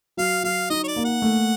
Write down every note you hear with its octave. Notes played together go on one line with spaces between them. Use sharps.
F#3 F5
F#3 F5
D#4 D#5
C#5
D5
A#3
F#5
A3